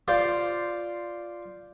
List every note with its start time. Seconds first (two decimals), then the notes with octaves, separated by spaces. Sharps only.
0.08 F4 C5 D5